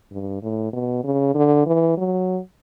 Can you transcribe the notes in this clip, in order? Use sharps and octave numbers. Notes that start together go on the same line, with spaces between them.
G2
A2
B2
C#3
D3
E3
F#3